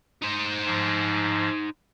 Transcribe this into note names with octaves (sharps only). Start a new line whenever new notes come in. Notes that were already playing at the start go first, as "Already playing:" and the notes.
D#4 C5
G#2 F3